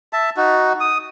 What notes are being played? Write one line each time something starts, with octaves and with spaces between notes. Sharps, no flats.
E5 A5
D#4 F#4
D#6